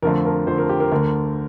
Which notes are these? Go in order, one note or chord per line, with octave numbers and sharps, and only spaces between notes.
F2 D3 F3 A3 A#4
A#4
F2 D3 F3 A3 C5
A#4
G4
A#4
D2 D3 A3 A#4